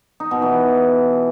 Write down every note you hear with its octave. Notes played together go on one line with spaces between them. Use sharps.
D#4
B2
E3